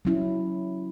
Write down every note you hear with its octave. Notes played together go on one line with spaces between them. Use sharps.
F#3 C#4 E4